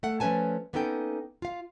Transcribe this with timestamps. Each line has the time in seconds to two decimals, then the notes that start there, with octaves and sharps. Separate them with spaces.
0.03 A3 A4 F#5
0.20 F3 A3 C#4 B4 G#5 A5
0.73 A#3 B3 C#4 D#4 A4 G5
1.42 F4 F5